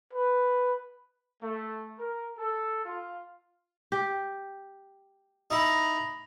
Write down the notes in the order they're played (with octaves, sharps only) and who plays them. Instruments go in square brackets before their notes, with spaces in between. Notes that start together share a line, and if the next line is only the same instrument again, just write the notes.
[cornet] B4
[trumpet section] A3
A#4
A4
F4
[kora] G4
[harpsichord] D#4 E4 [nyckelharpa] A#5 B5